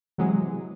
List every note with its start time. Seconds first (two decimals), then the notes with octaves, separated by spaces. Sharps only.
0.18 C3 E3 F#3 G#3